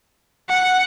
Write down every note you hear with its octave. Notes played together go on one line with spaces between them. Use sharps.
F#5